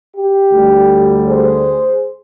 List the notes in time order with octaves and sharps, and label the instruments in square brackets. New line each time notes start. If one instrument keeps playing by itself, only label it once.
[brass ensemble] G4
D2 D3 G3
G#4 C5